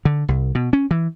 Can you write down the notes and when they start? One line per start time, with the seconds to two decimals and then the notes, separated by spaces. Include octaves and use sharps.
0.05 D3
0.28 C2
0.55 B2
0.73 C#4
0.91 E3